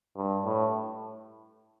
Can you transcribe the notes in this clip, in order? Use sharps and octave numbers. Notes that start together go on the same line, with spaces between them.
G2
A2